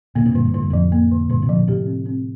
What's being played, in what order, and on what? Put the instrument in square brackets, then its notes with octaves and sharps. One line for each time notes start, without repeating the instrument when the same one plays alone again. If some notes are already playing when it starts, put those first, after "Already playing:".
[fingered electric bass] A#2 D3 [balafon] A#3
[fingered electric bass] A2 C3
[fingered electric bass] G2 A#2 [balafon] D3
[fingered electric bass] G2
[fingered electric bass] A2 [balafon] D3
[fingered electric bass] G2
[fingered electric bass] F2 A2 [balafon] F3
[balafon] A#3
D3
[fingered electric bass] G2 A#2 [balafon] D3
[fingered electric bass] A2 C3
[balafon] F3
[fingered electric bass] A#2 D3
[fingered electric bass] A2 C3 [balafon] G4
[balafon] C4
C4